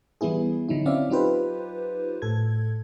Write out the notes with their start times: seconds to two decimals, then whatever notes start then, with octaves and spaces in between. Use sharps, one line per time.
0.21 E3 G3 B3 E4 G#4
0.69 D3 F#3 D#4 E4
0.86 C4 C#4 E4 D5 E5 F5
1.10 F#3 D#4 F4 G4 B4 C5
2.22 A2 A4 G#6